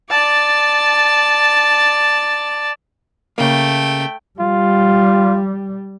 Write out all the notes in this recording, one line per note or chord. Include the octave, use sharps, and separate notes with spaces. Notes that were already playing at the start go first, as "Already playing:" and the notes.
D5 A5
C#3 A3 A#3 G5
G3 F4